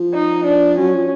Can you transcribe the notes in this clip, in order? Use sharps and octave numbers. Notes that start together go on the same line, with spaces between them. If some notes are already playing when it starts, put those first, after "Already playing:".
Already playing: F3
D#4
D4
F#3 C#4
F3